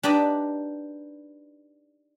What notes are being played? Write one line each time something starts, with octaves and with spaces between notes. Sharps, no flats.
D4 D#4 G4 B4 D5 D#5